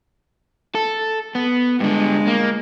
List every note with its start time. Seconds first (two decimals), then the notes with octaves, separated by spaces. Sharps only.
0.75 A4
1.35 B3
1.80 G2 D3 G#3
2.27 A#3